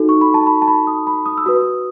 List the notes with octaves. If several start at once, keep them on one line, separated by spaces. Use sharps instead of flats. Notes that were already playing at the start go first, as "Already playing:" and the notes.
Already playing: D#4 F#4 A4
C#6
B5
A5
B5
A5
B5
D#6
B5
D#6
E6
F#4 B4 D#6